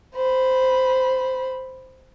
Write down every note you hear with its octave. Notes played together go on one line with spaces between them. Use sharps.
C5 B5